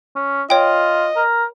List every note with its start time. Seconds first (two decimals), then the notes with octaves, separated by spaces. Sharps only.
0.16 C#4
0.50 F4 C#5 D#5 G5
1.16 A#4